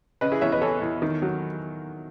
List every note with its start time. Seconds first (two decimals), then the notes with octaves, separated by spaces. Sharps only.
0.21 C#3 B4 D#5
0.32 E4 G#4
0.41 E2 C#5 E5
0.52 B4 D#5
0.61 E3 A4 C#5
0.82 E2
1.02 D#3
1.22 F#3